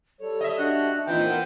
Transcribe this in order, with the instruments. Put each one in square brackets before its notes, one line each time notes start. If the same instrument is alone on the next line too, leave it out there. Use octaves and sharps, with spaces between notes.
[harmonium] G3 C#5 [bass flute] A4
[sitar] D#5 E5
[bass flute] D4 [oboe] F#4
[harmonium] A#2 C4 D#4 [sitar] E3 [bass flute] F4 [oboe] G5
[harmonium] F3 B3 [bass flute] A#4